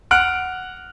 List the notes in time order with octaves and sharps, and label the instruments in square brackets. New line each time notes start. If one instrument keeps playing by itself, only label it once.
[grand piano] F#5 F6 F#6 D7